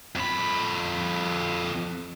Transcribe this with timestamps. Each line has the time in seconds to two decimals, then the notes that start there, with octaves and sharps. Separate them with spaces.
0.16 F2 B5